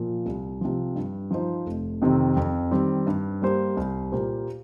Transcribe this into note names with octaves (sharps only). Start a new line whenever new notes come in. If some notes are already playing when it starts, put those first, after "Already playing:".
Already playing: A#2 F3
C2
C3 F3
G2
F3 D#4 C5
F1
F2 C3 D#3 C4
F2
D#3 G3 C4
G2
G3 A#3 G4 C5
C2
A#2 A#3 G4 C5